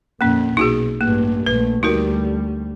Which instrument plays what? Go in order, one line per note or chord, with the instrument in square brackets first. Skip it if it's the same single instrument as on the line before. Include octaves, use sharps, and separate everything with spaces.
[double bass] F2 A#2 [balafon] A#3 C#4
[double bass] B1 [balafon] D#4 F#4 G#4
[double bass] A1 G2 [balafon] A#3
[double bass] A#1 A3 [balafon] B4
[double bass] D2 G3 [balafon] D#4 F#4 A#4